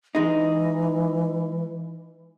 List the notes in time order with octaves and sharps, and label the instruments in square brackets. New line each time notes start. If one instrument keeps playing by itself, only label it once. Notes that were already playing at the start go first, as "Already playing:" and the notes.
[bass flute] E3 [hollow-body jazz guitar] G#3 D#4